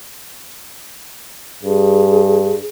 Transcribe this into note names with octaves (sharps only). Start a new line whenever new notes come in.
G2 G#4